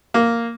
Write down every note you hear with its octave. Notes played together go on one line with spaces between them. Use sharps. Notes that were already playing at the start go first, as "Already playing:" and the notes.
A#3